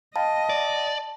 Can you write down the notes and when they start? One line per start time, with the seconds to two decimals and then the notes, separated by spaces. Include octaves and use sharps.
0.16 D#5 F5 G5 A5 B5
0.49 D5